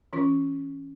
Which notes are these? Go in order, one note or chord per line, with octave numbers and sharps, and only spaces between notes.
E3 C#4 F4 C#6